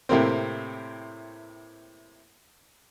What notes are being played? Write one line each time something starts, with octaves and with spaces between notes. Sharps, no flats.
A2 C3 A#3 C4